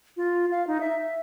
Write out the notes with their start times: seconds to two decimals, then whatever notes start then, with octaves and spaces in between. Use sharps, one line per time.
0.17 F4
0.51 F5
0.67 D#4
0.80 E5